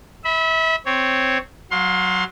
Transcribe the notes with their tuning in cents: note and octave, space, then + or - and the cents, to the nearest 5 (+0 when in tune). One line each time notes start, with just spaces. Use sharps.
E5 -30 B5 +0
C4 +0 C#5 +0
F#3 +0 F5 +30 C6 +15